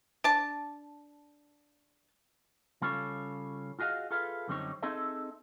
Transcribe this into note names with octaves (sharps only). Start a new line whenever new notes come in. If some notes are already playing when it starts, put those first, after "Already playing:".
D4 A5
C#3 G3 C#4 F4 A4 C#5
F4 F#4 G#4 D#5 F5
F4 G#4 A4 B4 E5 F5
F#2 D3 G3 C4 D#4 C#5
C4 D#4 G#4 A4 D#5 E5